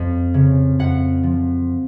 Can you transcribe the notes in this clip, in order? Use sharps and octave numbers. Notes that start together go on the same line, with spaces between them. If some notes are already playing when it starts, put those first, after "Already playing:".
Already playing: F2 F3
C#3
F2 F#5
F3